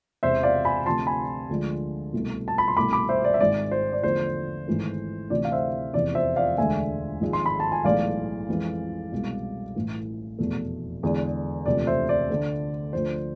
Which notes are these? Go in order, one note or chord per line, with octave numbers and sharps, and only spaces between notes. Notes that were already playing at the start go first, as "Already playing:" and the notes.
E1 E2 C3 C5 E5
D5 F5
G#5 B5
D2 C3 F3 A5 C6
G#5 B5
D2 D3 F3 G#3
C2 B2 A3
A5
B5
C6
C2 B2 A3 B5 D6
B5 D6
C5 E5
D5
E5
G#1 G#2 G#3 D5
C5
D5
E2 D3 F3 A3 C5
G#1 G#2 E3 A3
D2 C3 E3 A3 D5
F5
C5 E5
F1 E2 C3 E3 D5
C5 E5
D5 F5
E1 D2 D3 G#3 E5 G#5
G#1 G#2 F3 G#3
C6
B5
A5
G#5
B1 A2 E3 G#3 D5 F5
F2 E3 G#3
C2 B2 G#3
A1 A2 E3
F1 E2 B2 A3
E2 D3 G#3
E1 D2 C3 F3 A3 D5
C5 E5
D5
D2 D3 A3
D2 D3 F3 C5